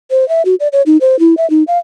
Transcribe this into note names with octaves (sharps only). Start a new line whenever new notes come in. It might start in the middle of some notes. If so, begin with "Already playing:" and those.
C5
E5
F#4
D5
C#5
D#4
C5
E4
E5
D#4
F5